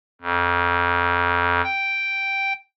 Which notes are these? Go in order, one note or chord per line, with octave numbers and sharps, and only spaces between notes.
F2
G5